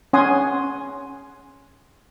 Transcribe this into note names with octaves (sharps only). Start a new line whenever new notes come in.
C#4 F#5 G#5 C6 D#6